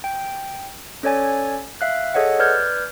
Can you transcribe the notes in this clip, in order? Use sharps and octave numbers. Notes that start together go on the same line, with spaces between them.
G5
C#4 A4 C#5 D5 G#5 A6
E5 F5 F#6
G#4 A4 C#5 D#5 F#5
B4 D5 F6 G6 G#6